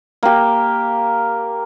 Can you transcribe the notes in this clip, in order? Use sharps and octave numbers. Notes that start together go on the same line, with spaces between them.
A#3 G4